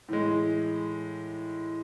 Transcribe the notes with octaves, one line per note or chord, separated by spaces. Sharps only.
A2 E3 G#3